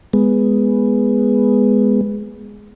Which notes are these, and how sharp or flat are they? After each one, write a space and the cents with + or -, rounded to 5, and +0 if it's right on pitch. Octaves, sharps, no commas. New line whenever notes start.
G#3 +0 B3 +0